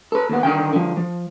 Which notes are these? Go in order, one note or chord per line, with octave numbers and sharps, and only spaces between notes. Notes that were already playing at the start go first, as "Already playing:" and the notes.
A4 B4
D#2 B3
D3 D#3 G5
D3 F3
F3